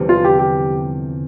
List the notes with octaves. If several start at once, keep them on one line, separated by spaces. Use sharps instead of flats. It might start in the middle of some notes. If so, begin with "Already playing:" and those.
Already playing: F1 E2 D3 G3
F4
G4
G4